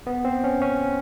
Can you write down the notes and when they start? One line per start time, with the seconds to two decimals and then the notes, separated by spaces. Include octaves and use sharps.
0.07 B3
0.25 C4
0.44 C#4
0.62 C#4